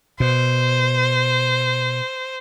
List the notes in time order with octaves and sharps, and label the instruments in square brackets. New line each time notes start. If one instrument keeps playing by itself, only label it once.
[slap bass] B2 [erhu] C5